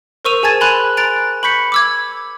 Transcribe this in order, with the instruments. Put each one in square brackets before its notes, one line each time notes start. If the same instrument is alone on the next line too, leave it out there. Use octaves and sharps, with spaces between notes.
[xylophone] A#4 C5 C#6 E6 D#7 F7
G#4 G#5 A5 G#6 A6 E7
G#5 B5 C6 F#6 F7
A#5 F#6 A6 D7 F7
B5 C#6 G6 B6 C#7
D6 E6 G#6